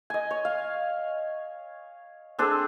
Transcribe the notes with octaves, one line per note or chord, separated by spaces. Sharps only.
D#5 G#5
C#5
F5
C4 D4 G#4 A4